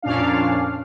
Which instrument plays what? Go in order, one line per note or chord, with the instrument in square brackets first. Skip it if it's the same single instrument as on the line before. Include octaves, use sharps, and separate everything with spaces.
[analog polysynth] F2 A#2 C#4 D4 F5